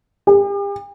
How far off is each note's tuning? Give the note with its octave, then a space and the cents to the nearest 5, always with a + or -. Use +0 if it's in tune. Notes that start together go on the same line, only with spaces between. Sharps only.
G4 +40